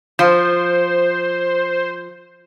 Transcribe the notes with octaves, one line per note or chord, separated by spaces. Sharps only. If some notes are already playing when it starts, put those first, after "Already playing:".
F3 C5